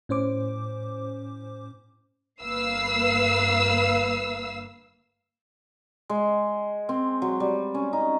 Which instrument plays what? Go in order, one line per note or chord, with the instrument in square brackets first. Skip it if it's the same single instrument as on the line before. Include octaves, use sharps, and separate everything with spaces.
[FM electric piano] A2 C#4 C5 D6
[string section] G1 A#3 B4 F5 E6 C7
[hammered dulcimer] G#3
C4
F#3
G3
C#4
D#4